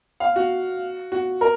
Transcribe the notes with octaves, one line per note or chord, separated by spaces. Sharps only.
F5
F#4
F#4
A#4